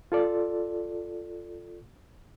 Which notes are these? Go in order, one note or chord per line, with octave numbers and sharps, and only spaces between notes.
F4 A4 D5